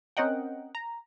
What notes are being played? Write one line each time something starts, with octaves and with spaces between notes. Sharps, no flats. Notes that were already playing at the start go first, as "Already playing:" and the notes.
C4 C#4 A#4 D#5 F#5 G5
A#5